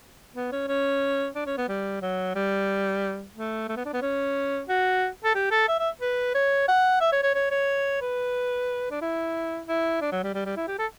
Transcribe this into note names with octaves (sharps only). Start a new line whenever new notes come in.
B3
C#4
C#4
D4
C#4
B3
G3
F#3
G3
A3
A3
B3
D4
B3
C#4
F#4
A4
G4
A4
E5
E5
B4
C#5
F#5
E5
C#5
C#5
C#5
C#5
B4
D4
E4
E4
D4
F#3
G3
G3
G3
E4
G4
A4